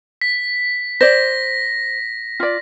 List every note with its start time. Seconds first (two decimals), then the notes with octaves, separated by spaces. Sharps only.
0.21 B6
1.01 C5 D5 A#6
2.40 F4 D5